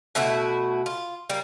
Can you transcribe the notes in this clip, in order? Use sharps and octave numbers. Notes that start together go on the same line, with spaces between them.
B2 A3 E4 F#4
F4
G3 A#3